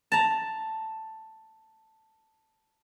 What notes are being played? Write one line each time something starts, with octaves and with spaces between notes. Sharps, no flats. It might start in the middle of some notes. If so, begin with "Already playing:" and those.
A5 A#5